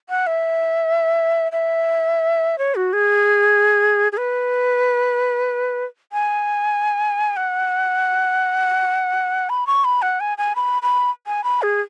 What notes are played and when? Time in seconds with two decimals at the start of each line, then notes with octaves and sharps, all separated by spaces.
0.09 F#5
0.27 E5
1.52 E5
2.58 C#5
2.75 F#4
2.93 G#4
4.12 G#4
4.17 B4
6.12 G#5
7.36 F#5
9.49 B5
9.67 C#6
9.84 B5
10.02 F#5
10.20 G#5
10.38 G#5
10.56 B5
10.82 B5
11.26 G#5
11.44 B5
11.62 G#4